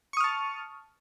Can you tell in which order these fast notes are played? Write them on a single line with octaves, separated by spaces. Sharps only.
C#6 D#6 F6 A5